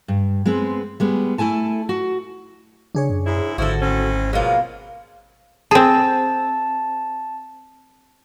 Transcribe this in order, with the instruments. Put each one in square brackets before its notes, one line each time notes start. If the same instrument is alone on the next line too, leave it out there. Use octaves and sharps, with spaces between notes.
[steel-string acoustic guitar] G2
G#3 B3 C4 B4
G3 G#3 B3
A3 E4 A4 G#5 A5
F#4
[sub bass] C#3 [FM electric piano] D4 G#4 C#5
[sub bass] F#2
[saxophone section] G#2 E4
[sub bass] G#1 [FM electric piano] G#2 D3 [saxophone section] F3 E4 [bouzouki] F#4 A4
[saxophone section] A2 C4 C#4
[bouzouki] B2 A#3 [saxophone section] F3 F#3 G#3
[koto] C4 G#4 [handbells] A5